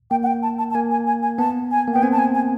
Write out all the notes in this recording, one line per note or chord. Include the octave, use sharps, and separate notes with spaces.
A#3 G5
F#5
G5
A5
A5
A5
A#3 G#5
G#5
G#5
G#5
B3 A5
G#5
A#3
B3 G5
C4 G#5
A5
G#5
G#5